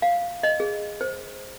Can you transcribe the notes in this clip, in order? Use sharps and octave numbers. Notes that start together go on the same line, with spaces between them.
F5
D#5
G#4
C5